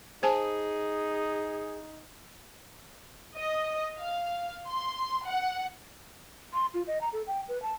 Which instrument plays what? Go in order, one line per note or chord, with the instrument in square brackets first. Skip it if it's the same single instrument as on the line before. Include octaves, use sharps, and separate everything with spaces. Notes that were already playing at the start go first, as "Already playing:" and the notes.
[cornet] D#4 [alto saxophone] G#4 [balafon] C5 G#5 A5
[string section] D#5
F5
C6
F#5
[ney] C6
F4
D#5
A#5
A4
G5
B4
A5